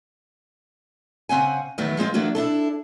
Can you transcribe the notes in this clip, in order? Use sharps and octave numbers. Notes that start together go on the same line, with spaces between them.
C#3 C4 F#5 G#5
E2 D#3 F#3 A3 B3
F3 G#3 C4 F4
E3 F#3 A3 A#3 D4 F#4
D4 E4 A4